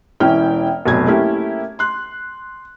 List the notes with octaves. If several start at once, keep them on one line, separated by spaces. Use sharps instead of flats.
E1 E3 C#4 E4 G5 F6
F1 B1 F#3 G#6
A3 A#3 C#4 E4 G4
C6 F#6